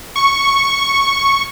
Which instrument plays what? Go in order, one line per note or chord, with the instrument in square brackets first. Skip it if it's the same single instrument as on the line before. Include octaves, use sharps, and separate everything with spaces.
[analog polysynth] C#6